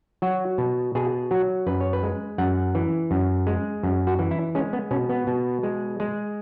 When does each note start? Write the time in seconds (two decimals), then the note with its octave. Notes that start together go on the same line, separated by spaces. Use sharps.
0.22 F#3 F#4
0.58 B2
0.95 B2 G#4
1.31 F#3 F#4
1.67 F#2 B4
1.80 C#5
1.93 B4
2.03 G#3
2.38 F#2 F#5
2.75 E3
3.11 F#2
3.47 G#3
3.83 F#2
4.07 F#4
4.19 E3
4.31 E4
4.55 G#3 C#4
4.73 B3
4.91 B2 C#4
5.09 B3
5.27 B2
5.63 G#3
6.00 G#3